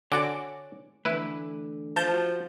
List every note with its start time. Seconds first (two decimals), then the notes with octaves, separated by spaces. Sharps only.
0.12 D3 F#4 C#5 D5 G#5 D6
1.05 D3 E3 A3 E4 B4
1.96 F3 A5 G6
2.14 F#4